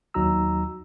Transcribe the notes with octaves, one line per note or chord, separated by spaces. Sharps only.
D#2 F#3 D#4 F#4 A#5 E6